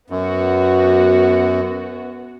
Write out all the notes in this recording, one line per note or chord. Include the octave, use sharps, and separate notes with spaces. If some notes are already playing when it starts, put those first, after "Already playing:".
F#2 B3 F#4